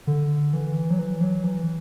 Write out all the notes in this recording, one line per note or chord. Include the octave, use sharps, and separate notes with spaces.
D3
E3
F#3
E3
F#3
E3